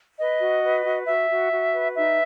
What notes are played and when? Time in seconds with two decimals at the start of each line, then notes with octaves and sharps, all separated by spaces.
0.19 B4 D#5
0.41 F#4
0.63 B4
0.85 F#4
1.07 F#4 E5
1.30 F#4
1.52 F#4
1.74 B4
1.96 D#4 E5